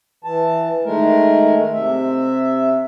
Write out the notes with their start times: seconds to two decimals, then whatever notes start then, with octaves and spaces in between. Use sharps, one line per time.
0.24 E3 A5
0.85 D#3 G#3 A3 A#4
1.74 C3 E5